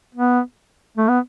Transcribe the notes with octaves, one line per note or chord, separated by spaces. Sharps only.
B3
A3
B3